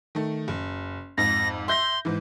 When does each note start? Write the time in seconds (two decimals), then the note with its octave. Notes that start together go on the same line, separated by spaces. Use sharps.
0.15 D#3 A3
0.48 F#1
1.18 F2 G#2 A#6
1.68 E5 C6 G6 A#6
2.05 G#2 E3